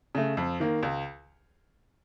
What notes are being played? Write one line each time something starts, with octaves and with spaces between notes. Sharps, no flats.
C#3 A3
F2
D#3 A#3
C#2